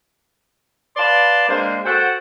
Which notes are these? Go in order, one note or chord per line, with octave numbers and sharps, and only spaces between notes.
B4 D5 F5 A5 C6
G#3 A#3 D4 C5
F#4 A4 C5 F#5 G5